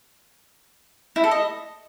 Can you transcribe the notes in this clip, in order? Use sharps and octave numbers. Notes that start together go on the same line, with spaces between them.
E4
A4
D#5